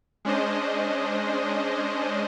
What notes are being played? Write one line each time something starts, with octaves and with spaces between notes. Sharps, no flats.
G#3 C#4 D4 C5 D#5